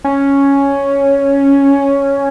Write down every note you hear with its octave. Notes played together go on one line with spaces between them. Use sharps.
C#4